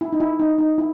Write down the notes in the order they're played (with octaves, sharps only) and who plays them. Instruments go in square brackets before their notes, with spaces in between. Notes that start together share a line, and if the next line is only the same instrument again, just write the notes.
[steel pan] E4
D#4
E4
D#4
D#4
E4